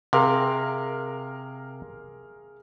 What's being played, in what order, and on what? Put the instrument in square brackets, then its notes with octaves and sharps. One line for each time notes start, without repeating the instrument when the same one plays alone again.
[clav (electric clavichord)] C3 [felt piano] G#4 A#4 F5